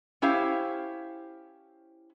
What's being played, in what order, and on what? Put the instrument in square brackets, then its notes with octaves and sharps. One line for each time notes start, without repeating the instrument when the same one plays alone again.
[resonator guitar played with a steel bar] C#4 E4 G4 C5 F5